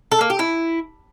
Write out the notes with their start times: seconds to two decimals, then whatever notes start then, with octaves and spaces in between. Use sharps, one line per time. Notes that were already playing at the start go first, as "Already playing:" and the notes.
0.12 A4
0.21 A#3
0.30 G4
0.39 E4